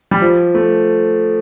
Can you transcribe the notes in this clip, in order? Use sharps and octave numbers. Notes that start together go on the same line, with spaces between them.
G3
F3
A3